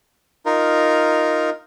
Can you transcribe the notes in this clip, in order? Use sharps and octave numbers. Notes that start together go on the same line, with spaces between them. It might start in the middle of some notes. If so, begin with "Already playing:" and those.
D#4 F4 A#4